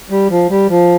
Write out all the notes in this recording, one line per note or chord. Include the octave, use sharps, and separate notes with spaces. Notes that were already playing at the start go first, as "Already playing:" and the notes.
G3
F3
G3
F3